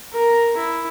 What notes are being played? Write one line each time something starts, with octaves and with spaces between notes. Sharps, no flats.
A#4 A#5
E4